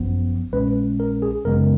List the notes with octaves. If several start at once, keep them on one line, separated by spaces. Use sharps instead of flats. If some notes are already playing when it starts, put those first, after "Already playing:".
Already playing: G#1 F#2 F3 B3
A#1 A#2 G#3 C#4 B4
A#4
G#4
G#1 F#2 C#3 G#3 B3 A#4